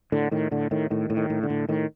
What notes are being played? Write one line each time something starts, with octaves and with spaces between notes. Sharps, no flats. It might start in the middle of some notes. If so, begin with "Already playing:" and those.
A2 D3
A2 D#3
A2 D3
A2 D#3
A2 D#3
A2
D#3
A2
D3
A2
A2 D#3